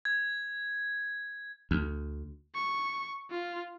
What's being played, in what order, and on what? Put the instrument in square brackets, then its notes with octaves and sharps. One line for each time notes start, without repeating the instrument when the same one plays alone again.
[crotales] G#6
[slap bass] D2
[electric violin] C#6
F4